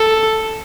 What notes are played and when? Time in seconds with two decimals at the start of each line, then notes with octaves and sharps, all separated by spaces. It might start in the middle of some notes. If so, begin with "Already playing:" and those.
Already playing: A4